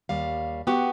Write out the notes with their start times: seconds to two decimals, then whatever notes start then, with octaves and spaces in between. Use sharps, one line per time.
0.09 D#2 G3 F5
0.67 B3 F#4 G4